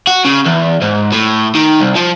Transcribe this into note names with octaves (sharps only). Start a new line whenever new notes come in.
F#4
C#3
E2
G#2
A2
D#3
C2
F3